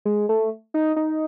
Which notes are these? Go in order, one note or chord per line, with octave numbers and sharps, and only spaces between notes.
G#3
A3
D#4
D#4